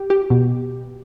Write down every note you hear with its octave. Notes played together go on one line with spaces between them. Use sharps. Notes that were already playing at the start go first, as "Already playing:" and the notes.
Already playing: G4
G4
B2